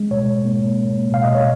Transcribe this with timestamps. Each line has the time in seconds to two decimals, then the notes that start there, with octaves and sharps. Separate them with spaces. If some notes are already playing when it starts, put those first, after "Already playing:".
Already playing: G#3
0.11 B2 C#5
0.45 A#3
0.79 A#3
1.12 B2 F5
1.24 D#5
1.35 C#5